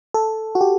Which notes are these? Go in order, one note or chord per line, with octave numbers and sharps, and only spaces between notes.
A4
F#4
G4